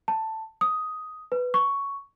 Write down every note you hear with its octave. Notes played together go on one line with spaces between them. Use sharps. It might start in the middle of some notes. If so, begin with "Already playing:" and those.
A5
D#6
B4
C#6